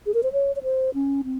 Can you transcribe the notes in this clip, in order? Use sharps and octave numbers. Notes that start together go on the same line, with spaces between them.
G#4
A#4
C5
C#5
C#5
C5
C#4
C4